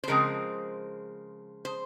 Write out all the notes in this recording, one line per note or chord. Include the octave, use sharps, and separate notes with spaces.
C5
C#3 F3 G#3 C4 A#4
C5